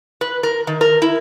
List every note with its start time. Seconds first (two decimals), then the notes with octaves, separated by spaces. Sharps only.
0.21 B4
0.43 A#4
0.67 D#3
0.81 A#4
1.02 E4